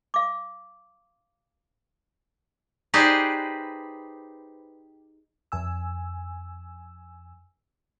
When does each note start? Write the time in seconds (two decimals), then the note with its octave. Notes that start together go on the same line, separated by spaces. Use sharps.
0.14 F5 D6
2.94 D#4 G4 G#4 B4 C5 D5
5.52 F2 G#5 E6